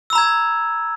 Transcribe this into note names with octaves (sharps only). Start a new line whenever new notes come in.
A#5 B5 E6 G#6